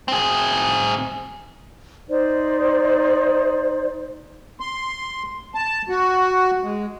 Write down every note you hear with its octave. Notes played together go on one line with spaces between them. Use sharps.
C4 G#4
D#4 C5 D5
C6
A5
F#4
G#3